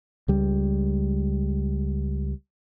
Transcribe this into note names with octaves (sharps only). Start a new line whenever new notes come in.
C#2 G3